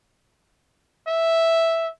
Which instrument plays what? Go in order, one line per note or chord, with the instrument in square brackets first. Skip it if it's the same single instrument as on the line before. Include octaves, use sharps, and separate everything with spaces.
[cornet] E5